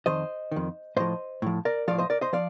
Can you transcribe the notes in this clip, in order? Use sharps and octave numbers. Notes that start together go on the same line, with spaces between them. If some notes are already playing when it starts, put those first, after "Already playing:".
F2 D#3 C5 D#5
F2 D#3
A2 F3 C5 D#5
A2 F3
A#4 D5
A2 F3 D5 F5
C5 D#5
A#4 D5
C5 D#5
F3 D5 F5